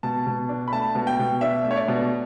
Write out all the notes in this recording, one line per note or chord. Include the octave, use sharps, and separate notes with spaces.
B2 A5
B2
D4
B5
A3 A5
B2
G5
B2
D4 E5
A3
C#5
D5
B2